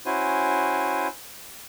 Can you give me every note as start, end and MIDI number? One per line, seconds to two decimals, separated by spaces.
0.06 1.07 61
0.06 1.07 64
0.06 1.07 66
0.06 1.07 72
0.06 1.07 80